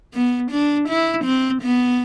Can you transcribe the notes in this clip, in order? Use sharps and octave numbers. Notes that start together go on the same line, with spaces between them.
B3
D4
E4
C4
B3